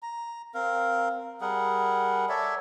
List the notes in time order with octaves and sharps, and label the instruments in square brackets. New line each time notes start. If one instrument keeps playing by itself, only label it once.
[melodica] A#5
C4 A#4 F5
G3 G#4 A#4 F#5
A4 C#5 D5 E5